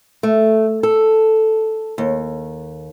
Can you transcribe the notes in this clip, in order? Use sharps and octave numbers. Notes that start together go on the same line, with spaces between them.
A3
A4
D#2